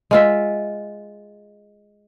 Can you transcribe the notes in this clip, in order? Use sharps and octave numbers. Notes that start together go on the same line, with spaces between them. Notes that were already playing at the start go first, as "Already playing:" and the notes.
G#3 F4 E5